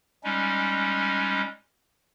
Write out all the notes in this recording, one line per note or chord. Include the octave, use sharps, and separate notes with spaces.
G3 G#3 C#4 D#4